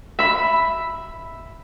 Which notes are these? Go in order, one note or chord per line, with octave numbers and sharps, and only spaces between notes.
E5 B5